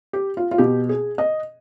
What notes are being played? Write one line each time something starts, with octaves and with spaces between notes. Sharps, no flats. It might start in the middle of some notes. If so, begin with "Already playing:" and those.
G4
F4
F4
B2 G4
G#4
D#5